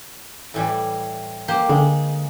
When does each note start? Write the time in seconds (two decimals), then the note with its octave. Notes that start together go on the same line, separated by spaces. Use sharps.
0.54 A2 E3 G3
1.48 A#3 G4 C5
1.69 D3 G#3